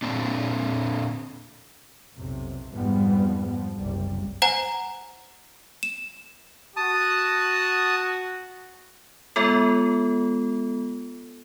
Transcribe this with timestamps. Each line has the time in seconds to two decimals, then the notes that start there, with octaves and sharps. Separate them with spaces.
0.02 A#2 C4 D4
2.16 B1 F2 C3
2.74 F2 G#2 F3 G3 B3
3.49 F3
3.78 F#1 C2 G3
4.42 C5 F#5 G#5 A#5
5.83 E7
6.77 F#4 A5 D#6
9.36 G#3 B3 F4 A4